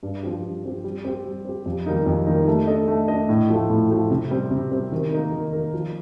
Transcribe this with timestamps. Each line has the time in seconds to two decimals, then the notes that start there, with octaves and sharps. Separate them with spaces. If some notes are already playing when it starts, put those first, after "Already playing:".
0.03 G2
0.23 F3 C4 G4
0.43 G2
0.64 F3 C4 G4
0.84 G3
1.05 C4 G4
1.25 G3
1.45 C4 G4
1.66 F2
1.86 D#3 G3 A#3 D#4
2.06 F2
2.27 D#3 G3 A#3 D#4
2.47 A3
2.67 D4 A4 D#5
2.88 A3
3.08 D4 A4 D#5
3.29 A2
3.49 F3 A3
3.69 A2
3.90 F3 A3
4.11 C3
4.31 G3 C4
4.51 C3
4.71 G3 C4
4.92 D#3
5.12 A#3 D#4 A#4
5.32 D#3
5.53 A#3 D#4 A#4
5.74 F3